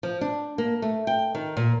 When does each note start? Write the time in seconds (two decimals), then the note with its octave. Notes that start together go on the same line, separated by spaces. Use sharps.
0.03 F3
0.21 D4
0.58 A#3
0.82 A3
1.07 G5
1.35 D#3
1.57 A#2